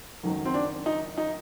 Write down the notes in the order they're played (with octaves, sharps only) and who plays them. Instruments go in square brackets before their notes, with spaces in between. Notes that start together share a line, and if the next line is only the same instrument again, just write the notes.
[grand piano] F#1 F#2 D#3 F#3
[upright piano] C4
D4
D#4
D#4